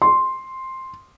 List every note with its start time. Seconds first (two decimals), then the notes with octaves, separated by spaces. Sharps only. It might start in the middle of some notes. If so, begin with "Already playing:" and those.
0.02 C6